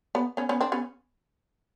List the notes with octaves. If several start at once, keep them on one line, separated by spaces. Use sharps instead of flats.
B3
B3 C#4
B3 C#4
C4 D4
B3 C#4